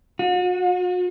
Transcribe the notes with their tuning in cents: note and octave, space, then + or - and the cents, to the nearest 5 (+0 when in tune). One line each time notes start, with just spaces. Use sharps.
F#4 -45